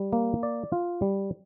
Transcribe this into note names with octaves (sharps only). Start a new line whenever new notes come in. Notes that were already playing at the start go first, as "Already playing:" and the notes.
Already playing: G3
A#3
D5
F4
G3